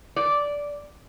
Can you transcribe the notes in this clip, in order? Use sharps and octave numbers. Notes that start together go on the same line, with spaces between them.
D5